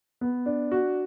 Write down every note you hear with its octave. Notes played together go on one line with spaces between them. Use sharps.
B3
D4
F#4